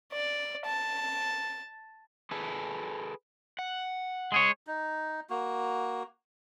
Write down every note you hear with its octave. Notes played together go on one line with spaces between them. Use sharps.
D5
A5
G#4 A4 B4
F#5
G#3 G#4 C#5
D#4
A#3 F#4